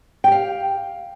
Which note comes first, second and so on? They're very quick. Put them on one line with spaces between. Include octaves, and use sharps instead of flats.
G5 G4 F5